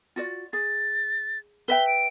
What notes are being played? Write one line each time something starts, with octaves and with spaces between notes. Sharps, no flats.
F4 F#4 D5
G#4 A6
B4 E5 G5 G7
D7